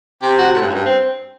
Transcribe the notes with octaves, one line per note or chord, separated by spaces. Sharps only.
C3 G4
F#4
A2
G2
F#2
G2
C4